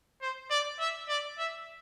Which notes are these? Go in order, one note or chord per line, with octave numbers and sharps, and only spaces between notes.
C5
D5
E5
D5
E5